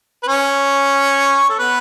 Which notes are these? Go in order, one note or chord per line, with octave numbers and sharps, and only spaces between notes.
B4
C#4 C#5
A4
B3 B4